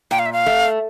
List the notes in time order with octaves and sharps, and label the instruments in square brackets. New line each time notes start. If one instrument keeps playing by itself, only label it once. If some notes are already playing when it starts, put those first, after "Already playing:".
[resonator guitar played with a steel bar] A#2 [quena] G5
[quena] F5
E5
F5
[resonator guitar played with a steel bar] A3